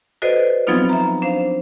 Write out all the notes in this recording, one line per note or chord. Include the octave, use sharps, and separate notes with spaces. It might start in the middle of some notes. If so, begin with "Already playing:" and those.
F#4 A4 B4 C5 D5 D#5
F3 F#3 B3 C4 D#4 F4
E5 A#5
D4 C5 F5